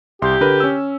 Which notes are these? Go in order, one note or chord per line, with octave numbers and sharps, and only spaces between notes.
C2 G4 C6
D3 A#4 B4
C#4 E6